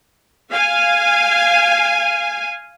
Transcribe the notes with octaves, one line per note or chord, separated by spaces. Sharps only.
F5 G#5